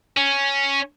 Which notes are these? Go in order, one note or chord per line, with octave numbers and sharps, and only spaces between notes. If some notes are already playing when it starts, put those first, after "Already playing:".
C#4